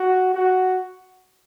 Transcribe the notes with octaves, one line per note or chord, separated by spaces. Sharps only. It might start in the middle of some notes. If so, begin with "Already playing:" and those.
Already playing: F#4
F#4